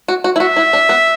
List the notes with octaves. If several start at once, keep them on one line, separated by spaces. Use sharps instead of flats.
F#4
F#4
E4
F#4 E5
E4
D4
B3